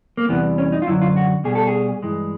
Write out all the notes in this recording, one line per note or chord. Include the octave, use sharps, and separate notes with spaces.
A#3
E2 C3 E3 G3 B3
C#4
D#4
F4
F#2 D3 F#3 E4
F4
F#4
B2 G3 G#4
A4
G#4
G2 E3 G#3